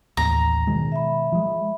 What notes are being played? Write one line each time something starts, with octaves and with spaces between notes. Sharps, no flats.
A1 D#2 A#5
B2 D#3 G#3
E5 B5
F3 G#3